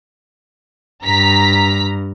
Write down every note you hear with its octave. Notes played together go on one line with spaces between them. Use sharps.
G2 A#5 B6